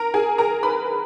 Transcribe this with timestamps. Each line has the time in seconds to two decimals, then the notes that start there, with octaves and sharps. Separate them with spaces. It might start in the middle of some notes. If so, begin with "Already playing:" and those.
Already playing: A#4 A#5
0.14 G#4 G#5
0.38 A#4 A#5
0.63 B4 B5